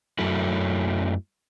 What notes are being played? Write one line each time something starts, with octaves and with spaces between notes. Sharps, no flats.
F#2 F#3 A3 E4